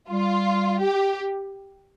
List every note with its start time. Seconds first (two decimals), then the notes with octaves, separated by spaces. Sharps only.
0.10 G3 F4
0.81 G4